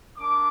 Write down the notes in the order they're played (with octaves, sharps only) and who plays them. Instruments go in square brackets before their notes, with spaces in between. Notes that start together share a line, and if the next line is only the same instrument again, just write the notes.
[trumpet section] A#3 D4 D6